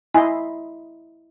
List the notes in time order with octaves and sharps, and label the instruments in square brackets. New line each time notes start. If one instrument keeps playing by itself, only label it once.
[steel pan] E4 D#5 C6 [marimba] G#5